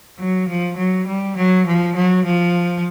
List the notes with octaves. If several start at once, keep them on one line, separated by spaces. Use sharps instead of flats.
F#3
F3
F#3
G3
F#3
F3
F#3
F3